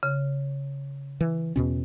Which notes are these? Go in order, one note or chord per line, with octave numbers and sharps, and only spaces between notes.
C#3
E3
E2 B2 C#4